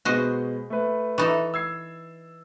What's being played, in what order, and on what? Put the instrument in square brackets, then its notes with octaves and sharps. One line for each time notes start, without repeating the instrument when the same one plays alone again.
[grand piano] B2 G#3 B3 [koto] F#4 C5 D#5
[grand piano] A3 B4
[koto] E3 D#4 A4 [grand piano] C#6 A6
[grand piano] E6 G#6 C7